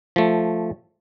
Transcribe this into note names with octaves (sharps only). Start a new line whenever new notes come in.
F3 A3